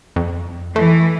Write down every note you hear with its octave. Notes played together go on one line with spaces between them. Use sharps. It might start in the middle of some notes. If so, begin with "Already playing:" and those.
F2
E3 A3